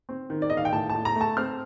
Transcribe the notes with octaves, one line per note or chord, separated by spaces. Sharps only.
C4
D#3
D5
D#3 D#5
F5
G5
A2 A5
A5
A2
A#5
A3
A5
C4 F6